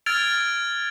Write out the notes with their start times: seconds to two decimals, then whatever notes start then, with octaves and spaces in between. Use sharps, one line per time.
0.06 E6 F6 G#6 A6 D7 F7